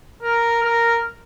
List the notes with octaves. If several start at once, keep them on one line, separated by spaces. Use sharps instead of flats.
A#4
A#4